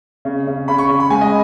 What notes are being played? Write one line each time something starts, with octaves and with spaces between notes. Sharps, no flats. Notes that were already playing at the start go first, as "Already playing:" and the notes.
C#3
C#3
C#3 B5
C#6
C#3
B5
G#3 G#5
D#5